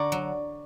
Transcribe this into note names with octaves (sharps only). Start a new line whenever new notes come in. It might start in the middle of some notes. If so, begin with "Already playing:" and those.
Already playing: D3 D5 A#5 C#6
F#3